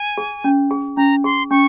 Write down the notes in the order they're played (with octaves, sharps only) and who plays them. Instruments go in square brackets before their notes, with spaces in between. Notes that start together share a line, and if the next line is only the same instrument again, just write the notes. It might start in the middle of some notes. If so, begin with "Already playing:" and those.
Already playing: [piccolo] G#5
[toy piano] G#4
C#4
G#4
[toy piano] C#4 [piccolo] A#5
[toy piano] G#4 [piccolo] C6
[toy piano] C#4 [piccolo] C#6